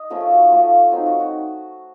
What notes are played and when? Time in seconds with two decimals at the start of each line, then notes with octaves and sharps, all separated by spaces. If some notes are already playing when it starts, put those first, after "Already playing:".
Already playing: D#5
0.10 F3 A3 C#4 F4 A#4
0.21 A4
0.31 F#4
0.43 A4
0.51 F3 A3 C#4 F4
0.92 F#3 C4 D#4 F4
1.06 F#4
1.20 F#4